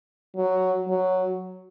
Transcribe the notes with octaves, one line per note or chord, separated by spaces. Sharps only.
F#3
F#3